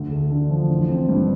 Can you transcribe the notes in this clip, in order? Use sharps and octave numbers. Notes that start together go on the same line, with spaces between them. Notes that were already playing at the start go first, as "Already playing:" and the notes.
Already playing: D2
A3
D3
F3
A1
C4
G2